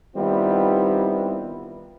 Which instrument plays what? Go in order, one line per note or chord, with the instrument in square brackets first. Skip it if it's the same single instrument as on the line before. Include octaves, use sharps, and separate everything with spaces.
[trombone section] D#3 G3 B3 C4 E4 F4